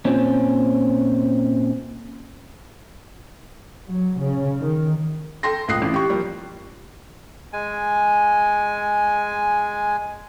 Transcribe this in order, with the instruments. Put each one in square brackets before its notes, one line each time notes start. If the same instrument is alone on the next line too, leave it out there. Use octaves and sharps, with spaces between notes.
[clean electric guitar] A#2 C4 C#4
[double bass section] F#3
C#3
D#3
[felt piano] A4 G5 C6 A#6
C#2 A#2 D#6 F#6 C7
A1
G4 C#6
F3 G3 A#3
[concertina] G#3 G#5